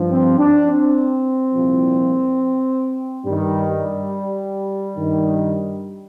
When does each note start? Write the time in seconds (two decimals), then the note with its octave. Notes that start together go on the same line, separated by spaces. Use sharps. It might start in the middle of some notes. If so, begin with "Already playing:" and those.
Already playing: G2 F3
0.10 C4
0.39 D4
0.67 C4
1.53 C2 A#2 F3
3.25 G2 D#3 G3
3.67 G3
4.97 G2 D#3